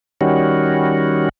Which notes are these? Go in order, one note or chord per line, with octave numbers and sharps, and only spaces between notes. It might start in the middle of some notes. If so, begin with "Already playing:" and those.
D#3 G3 C#4 F#4